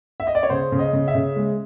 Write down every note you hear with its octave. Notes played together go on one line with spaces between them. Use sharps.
E5
D#5
D5
C#5
C#3 C5
C#3
D#5
C#3
E5
C#3
G#3